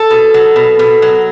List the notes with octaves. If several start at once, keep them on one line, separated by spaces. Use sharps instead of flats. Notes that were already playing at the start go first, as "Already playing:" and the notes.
Already playing: A4
B2
F#3
B2
B2
F#3